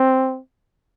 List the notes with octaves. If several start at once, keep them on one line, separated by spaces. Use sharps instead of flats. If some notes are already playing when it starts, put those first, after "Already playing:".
Already playing: C4